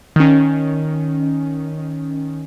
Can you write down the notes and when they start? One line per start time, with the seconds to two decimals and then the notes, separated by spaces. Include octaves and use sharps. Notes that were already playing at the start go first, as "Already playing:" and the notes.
0.16 D#3 C#4